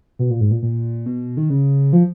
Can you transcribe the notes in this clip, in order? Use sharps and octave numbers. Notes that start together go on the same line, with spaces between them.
B2
A#2
G#2
A#2
A#2
B2
D#3
C#3
F3